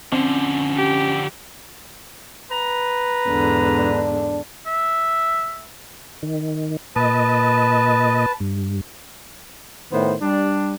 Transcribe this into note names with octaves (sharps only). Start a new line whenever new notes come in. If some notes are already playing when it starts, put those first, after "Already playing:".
D3 F3 C4 C#4
G4
B4 A#5
E2 G#2 D3
D4
E5
D#3
A#2 B4 D#5 A5
G2
A2 D#3 B3 C5
G3 D4